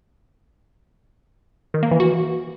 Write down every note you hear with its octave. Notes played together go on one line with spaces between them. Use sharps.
D#3
A#3
E3
F#4